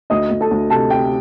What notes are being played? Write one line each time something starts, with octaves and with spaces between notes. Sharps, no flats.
D2 D#5 D#6
D2
A4 A5
D2
C3 A4 A5
C3 G4 G5